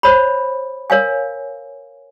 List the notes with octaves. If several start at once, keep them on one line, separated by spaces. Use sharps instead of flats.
C5 C#5 B5
A#4 C#5 F5 G#5